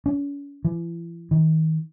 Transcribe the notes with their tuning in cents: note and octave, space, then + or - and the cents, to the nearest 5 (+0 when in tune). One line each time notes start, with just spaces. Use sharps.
C#4 +40
E3 +40
D#3 +35